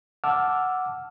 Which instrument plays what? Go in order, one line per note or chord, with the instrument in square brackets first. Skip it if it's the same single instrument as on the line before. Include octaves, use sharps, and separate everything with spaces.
[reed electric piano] F#5 A5 D6 E6 F6